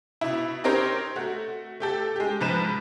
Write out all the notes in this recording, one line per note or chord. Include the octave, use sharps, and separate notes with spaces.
B2 E4
C4 D#4 G4 A#4 C5 C#5
A3 F#4
A3 G4 A4
G#3 G4
G#2 F3 B4 E7